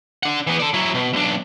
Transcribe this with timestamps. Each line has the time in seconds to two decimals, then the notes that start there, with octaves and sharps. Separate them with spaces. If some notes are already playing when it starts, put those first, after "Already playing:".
0.23 D4 F#5
0.47 E3 B3
0.60 A4 D5
0.74 F#3 E4
0.95 B2
1.13 B1 D4